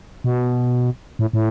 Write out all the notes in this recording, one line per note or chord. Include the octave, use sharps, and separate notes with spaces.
B2
A2
A2